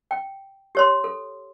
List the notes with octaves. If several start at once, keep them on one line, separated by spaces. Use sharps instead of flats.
G5
G4 C#5 C6
A4